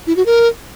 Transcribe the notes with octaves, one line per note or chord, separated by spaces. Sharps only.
E4
F#4
A#4